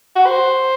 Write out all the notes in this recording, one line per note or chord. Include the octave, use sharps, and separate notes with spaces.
F#4
C5